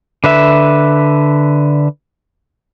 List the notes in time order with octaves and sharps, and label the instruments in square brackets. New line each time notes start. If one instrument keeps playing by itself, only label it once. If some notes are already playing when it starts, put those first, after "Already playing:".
[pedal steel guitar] D3 B4 E5